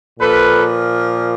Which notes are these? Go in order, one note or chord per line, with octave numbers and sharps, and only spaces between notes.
A#2 F3 A#3 A4 B4